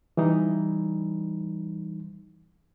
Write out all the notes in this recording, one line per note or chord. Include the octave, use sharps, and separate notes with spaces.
E3 G3 D#4